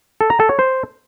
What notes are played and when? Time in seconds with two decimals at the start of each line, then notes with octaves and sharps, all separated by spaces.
0.21 A4
0.30 A#5
0.40 A4
0.49 C#5
0.59 C5